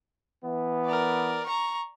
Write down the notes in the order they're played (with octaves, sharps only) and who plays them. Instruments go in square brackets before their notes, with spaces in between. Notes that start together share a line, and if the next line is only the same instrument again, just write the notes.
[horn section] E3 B3
[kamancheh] A#4 D5
A#5 C#6